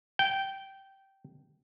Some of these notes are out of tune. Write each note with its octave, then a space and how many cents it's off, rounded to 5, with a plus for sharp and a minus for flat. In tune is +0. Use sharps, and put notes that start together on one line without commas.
G5 -10